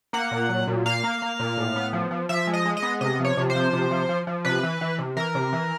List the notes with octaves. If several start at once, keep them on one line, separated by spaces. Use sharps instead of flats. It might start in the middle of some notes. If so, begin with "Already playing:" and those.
A#3 F#5
A#2
F#3
A#2
A#3 F5
A#3
A#3
A#2
A2
B3
F3
F3
F3 E5
G#3
D#5
G#3
D#5
B3
C3 D#5
F3
C#5
C3
C5
F3
C3
F3
F3
F3
C3 B4
E3
E3
C3
E3 A#4
C3
E3